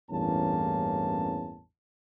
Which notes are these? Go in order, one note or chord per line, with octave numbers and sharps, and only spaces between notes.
A1 E2 G2 A#3 C#4 A5